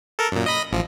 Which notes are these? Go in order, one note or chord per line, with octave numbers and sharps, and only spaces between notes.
A4 A#4
F#2 A#2
D#5 B5 A#6
A1 F3